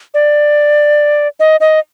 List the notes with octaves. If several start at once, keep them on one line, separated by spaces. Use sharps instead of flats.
D5
D#5
D#5